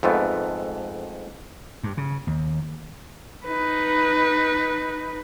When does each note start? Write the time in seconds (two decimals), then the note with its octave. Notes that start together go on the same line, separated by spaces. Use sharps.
0.03 F2 G#2 A3 B3
1.83 G2
1.97 C#3
2.27 D#2
3.45 D#4 B4